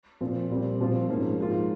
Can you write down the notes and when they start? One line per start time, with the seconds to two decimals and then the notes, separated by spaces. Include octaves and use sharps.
0.21 A#2 F3 C4 F4
0.50 A#2 G3 C4
0.79 A#2 F3 C4 F4
1.08 G#2 F3 A#3 C#4
1.38 G#2 F3 A#3 F4